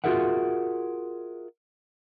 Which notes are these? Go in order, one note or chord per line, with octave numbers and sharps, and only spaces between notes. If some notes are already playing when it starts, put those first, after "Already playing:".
F4 F#4 G#4 A#4 E5 F#5